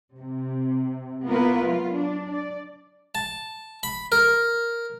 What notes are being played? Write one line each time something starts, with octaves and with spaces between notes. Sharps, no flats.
C3
A#3 B3 E4 F4 A#4 B4
F#3 F4
D4
D5
A5
B5
A#4